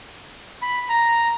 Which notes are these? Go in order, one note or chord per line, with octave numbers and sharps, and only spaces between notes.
B5
A#5